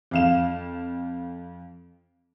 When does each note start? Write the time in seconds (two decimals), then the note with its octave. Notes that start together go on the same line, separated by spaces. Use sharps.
0.11 F2 F5 E7